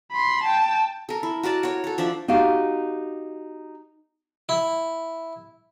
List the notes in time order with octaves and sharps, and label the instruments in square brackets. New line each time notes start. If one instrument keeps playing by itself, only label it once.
[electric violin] B5 C6
G5 A5
[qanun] A4 A#4
E4
F#4 A#4 D5 A5
C#5 F#5
A4 F#5
F3 D4 D5 E5
[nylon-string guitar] D#4 F#4 G4 F5
[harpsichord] E4